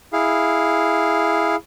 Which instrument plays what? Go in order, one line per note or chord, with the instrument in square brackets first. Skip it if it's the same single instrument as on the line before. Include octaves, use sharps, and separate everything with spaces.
[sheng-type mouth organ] E4 G#4 F5